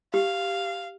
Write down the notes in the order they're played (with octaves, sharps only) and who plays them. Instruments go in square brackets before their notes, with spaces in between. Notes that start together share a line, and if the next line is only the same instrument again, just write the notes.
[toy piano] G4 [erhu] F5